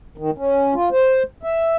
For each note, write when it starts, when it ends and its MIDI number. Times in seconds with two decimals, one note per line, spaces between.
0.18 0.31 51
0.38 0.74 61
0.74 0.89 65
0.92 1.23 72
1.43 1.77 76